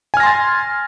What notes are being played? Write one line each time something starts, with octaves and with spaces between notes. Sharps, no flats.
G#5 C6 F6 A6 A#6